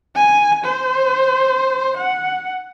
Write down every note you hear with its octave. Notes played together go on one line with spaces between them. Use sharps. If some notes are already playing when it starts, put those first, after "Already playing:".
G#5
C5
F#5